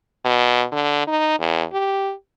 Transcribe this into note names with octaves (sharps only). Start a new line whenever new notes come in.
B2
D3
D#4
E2
G4